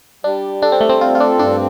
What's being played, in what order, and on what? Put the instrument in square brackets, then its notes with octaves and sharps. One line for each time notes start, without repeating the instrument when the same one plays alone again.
[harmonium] G3 [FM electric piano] D4
[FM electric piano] D4 [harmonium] A4
[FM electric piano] C4
A3
C4
[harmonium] C4 [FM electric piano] F4
[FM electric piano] F4
D4
[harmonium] G2 [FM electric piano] D4